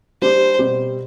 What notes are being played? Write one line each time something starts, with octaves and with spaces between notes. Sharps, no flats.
G3 D4 G4 C5
B2 G3 C4 G4